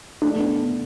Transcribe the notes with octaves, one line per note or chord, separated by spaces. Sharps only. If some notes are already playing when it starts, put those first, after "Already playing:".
A3 D4
B3